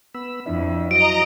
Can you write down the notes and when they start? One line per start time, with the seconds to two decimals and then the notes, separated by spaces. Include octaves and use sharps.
0.14 B3 B5 E6
0.46 F2 D4 E4 E5
0.91 F#3 E4 F#4 D#5 A#5 D7